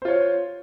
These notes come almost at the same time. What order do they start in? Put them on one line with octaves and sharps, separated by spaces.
C5 F4 C#5